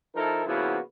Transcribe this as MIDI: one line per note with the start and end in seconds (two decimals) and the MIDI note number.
0.15 0.43 53
0.15 0.43 63
0.15 0.43 64
0.15 0.43 69
0.15 0.43 70
0.46 0.78 49
0.46 0.78 53
0.46 0.78 58
0.46 0.78 59
0.46 0.78 64
0.46 0.78 66